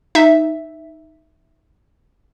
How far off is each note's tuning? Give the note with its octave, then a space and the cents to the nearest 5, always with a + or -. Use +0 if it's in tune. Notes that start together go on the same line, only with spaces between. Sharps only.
D#4 +0 E5 +0